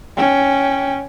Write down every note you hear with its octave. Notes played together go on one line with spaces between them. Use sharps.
C#4 G5